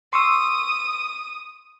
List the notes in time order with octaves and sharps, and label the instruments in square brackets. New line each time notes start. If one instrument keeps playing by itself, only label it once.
[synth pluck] C6 C#6 E6 [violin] D#6